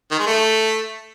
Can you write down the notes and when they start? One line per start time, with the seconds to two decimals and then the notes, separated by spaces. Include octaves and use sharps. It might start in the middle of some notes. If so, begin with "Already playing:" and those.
0.11 D#3
0.19 G#3
0.26 A3